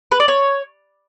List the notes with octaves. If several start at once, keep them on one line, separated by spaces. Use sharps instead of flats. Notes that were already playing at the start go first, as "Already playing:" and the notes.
B4
D5
C#5